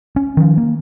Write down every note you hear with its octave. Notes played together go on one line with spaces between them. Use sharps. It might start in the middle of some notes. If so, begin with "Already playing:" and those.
C#4
D#3 F3
A#3